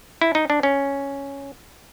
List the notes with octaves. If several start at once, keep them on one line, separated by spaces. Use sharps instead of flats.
E4
D#4
D4
C#4